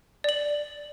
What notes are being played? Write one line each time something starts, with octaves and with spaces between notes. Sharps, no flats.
D5 F#7